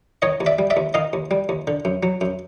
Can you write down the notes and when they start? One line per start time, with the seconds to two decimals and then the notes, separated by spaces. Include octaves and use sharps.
0.22 D#3 C#5 D#5
0.40 D#2
0.46 D5 E5
0.59 G3
0.70 D5 E5
0.77 D#2
0.94 D#3 D#5 F5
1.13 D#2
1.31 G3
1.49 D#2
1.67 D3
1.85 F#2
2.03 F#3
2.21 F#2